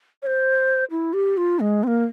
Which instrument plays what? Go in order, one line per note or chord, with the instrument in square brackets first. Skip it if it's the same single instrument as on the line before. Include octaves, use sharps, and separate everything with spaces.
[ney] C#5
C5
E4
G4
F4
G#3
C4
A#3